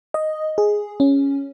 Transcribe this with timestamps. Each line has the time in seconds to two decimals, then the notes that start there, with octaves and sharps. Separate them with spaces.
0.14 D#5
0.58 G#4
1.00 C#4